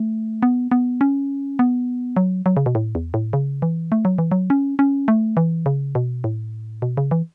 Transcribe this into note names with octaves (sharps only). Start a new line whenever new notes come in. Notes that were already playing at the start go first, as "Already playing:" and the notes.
Already playing: A3
B3
B3
C#4
B3
F#3
F#3
C#3
B2
A2
E2
A2
C#3
E3
A3
F#3
E3
F#3
C#4
C#4
A3
E3
C#3
B2
A2
B2
C#3
E3